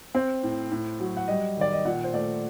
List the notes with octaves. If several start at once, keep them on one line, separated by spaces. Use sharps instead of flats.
C4 C5
A2
A2
F#3
F#5
G3 D#5
D#3 D5
D#5
A#2 F#5
C5
A3 D5